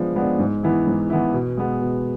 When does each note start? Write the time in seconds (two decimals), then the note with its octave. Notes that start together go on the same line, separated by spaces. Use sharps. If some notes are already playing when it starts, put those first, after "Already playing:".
Already playing: F3 G#3 B3 D4
0.16 G#3 B3 D4
0.39 G#2
0.63 E3 B3 E4
0.87 G#2
1.10 E3 B3 E4
1.33 B2
1.57 G#3 B3
1.81 B2